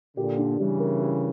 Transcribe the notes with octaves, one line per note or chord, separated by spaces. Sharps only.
A#2 D3 G4
D4
C#3 E3 G3
A#4
G4